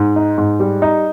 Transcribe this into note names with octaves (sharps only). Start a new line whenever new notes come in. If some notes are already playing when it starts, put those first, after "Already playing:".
Already playing: G#2
D#4
G#2
G3
D#4